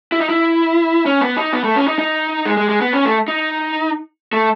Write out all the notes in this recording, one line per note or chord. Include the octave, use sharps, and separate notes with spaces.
E4
D#4
E4
C#4
B3
D#4
B3
A3
C#4
D#4
D#4
G#3
G#3
G#3
B3
C#4
A3
D#4
A3